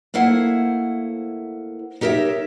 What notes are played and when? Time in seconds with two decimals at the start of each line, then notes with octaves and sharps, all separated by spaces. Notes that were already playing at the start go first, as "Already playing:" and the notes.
0.14 A3 A#3 E4 C5 F#5
2.01 D#4 G4 A#4 C#5 E5